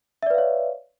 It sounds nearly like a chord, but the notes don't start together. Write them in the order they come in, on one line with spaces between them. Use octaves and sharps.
E5 D5 B4 F5 C#5